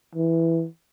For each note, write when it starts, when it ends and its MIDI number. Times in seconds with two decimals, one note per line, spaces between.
0.15 0.66 52